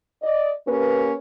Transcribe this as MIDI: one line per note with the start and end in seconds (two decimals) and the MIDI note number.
0.23 0.52 74
0.23 0.52 75
0.67 1.13 58
0.67 1.13 61
0.67 1.13 67
0.67 1.13 71